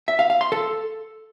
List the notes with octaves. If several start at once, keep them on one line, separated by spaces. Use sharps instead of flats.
E5
F5
F5
C6
A4